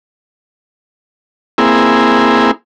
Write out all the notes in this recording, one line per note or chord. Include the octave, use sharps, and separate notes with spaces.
A#3 C4 E4 G#4